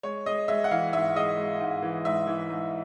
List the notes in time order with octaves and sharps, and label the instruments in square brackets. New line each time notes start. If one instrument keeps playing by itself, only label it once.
[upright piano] G#3 C#5
G#3 D#5
G#3 E5
F#5
E3 F5
G#2 E5
G#3 D#5
G#3
G#2
E3
G#2 E5
E3
G#2